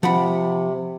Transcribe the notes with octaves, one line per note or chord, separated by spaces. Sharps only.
C3 F3 F#5 B5